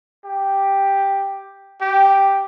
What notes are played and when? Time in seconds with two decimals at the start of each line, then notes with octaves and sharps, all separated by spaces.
0.25 G4
1.81 G4